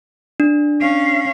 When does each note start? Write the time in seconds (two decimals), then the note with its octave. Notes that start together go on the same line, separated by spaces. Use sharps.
0.40 D4
0.80 C#4 F5